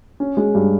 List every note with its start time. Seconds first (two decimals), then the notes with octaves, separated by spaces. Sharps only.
0.20 C#4
0.37 G#3
0.55 G2